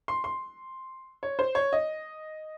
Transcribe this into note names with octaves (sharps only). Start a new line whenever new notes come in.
C6
C6
C#5
C5
C#5
D#5